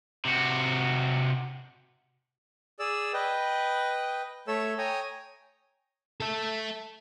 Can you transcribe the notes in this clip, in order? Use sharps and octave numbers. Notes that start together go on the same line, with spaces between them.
C3 F#4
G#4 D5 E6
B4 D#5 G5
A3 A4 C#5 E5 E6
C#5 G5 G#5 A#5 D#6
A4 E5